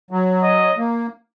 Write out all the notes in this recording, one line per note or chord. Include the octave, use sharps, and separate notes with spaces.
F#3
D#5
A#3